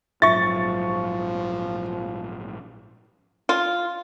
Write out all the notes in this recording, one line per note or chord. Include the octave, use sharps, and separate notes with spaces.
A#1 G#2 F3 F#3 F4 E5 C#6 A6
F4